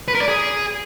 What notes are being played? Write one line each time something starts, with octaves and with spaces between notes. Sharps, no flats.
B4
A#4
D5
G#4